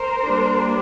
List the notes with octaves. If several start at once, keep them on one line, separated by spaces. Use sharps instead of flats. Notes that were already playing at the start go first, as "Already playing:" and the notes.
Already playing: A#4 C5
G3 A#3 D4